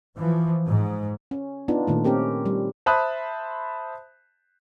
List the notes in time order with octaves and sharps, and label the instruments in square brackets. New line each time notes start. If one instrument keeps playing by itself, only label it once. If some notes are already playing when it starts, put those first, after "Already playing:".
[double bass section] E3 F3
G#2
[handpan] C#4
B3 D4 D#4 F4
A#2 D#3 A3
C4 C#4 G4 A#4
G3
[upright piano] C5 E5 A5 B5 D#6 F#6